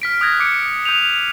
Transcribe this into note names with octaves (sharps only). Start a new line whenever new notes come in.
F6 B6 D7
D#6 F#6 G#6 A#6
D6 C#7 D7
D#6 G6 D#7 F7